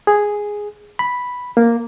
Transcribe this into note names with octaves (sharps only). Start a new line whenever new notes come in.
G#4
B5
A#3